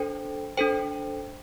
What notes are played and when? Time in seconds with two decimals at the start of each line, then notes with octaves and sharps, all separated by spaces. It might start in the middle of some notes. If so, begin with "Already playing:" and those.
Already playing: D4 A4 C5 G5
0.57 D4 A4 C5 G5